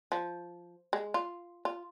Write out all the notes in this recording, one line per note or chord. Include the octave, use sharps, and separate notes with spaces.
F3
G#3
F4
F4